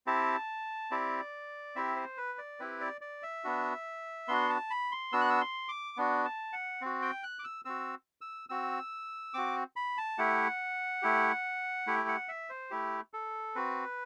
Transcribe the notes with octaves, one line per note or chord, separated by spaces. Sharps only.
C4 E4 G4 A5
C4 E4 G4 D5
C4 E4 G4 E5
C5
B4
D5
C4 E4 G4 B4
D5
D5
E5
B3 D4 F#4
B3 D4 F#4 C6
A5
B5
C6
B3 D4 F#4 E6
F#6
E6
C6
D6
B3 D4 F#4
A5
F#5
C4 F#4
G5
F#6
D6
E6
C4 F#4 E6
E6
C4 F#4 E6
C4 F#4 D6
B5
A5
A3 E4 G4 F#5
A3 E4 G4
A3 E4 G4
F#5
E5
C5
A3 E4 G4
A4
C4 F#4 B4